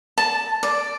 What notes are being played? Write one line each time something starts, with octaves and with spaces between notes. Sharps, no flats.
A5
D5